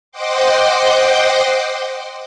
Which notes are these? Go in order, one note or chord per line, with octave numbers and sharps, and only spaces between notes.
C5 D#5 F#5 G5 C6 D6